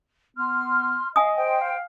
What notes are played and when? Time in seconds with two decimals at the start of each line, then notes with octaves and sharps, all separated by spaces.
0.37 B3 C6 F6
1.16 D#5 F5 G#5 D#6
1.36 C5 G5
1.61 F5